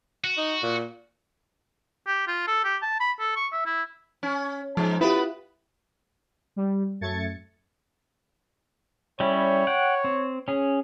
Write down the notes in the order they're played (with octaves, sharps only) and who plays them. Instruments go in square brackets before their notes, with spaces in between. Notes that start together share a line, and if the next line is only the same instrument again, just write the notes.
[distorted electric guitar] F#4
[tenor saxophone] D#4
A#2
[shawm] G4
F4
A4
G4
A5
B5
A4
C#6
E5
E4
[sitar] C#4
[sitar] G#2 G#3 [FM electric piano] F3
[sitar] B3 B4 [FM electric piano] E4 F4 G4
[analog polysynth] G3
F#2 A3 G#6 A6 C#7
[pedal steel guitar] G3 C#4 E4 [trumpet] C#5
[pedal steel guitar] F#5 G5
C4
C#4 G#4